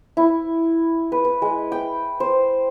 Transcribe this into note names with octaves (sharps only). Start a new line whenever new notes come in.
E4
B4
B4
G#3
G5
C5